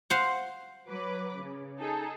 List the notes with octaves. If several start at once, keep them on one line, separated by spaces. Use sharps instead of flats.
C5 F5 F#5
F#3 B4 D6
C#3
D#4 G#4 A4